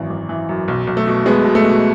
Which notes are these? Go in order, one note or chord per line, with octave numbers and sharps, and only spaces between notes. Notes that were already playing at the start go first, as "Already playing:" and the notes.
Already playing: G#1 F#2 E3
G#1
E3
F#2
B1
B1
A3
B2
B2 G#3 B3
B2
A3
B2